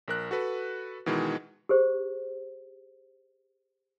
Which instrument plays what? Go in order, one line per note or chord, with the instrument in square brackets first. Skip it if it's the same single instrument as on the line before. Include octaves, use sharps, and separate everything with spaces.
[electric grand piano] A#1 A#4 F#6
F#4 A4 B4
B2 D#3 E3 G#3
[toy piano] G4 G#4 C5